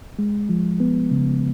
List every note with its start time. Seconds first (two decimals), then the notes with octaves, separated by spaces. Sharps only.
0.19 G#3
0.49 F3
0.80 B3
1.11 C#3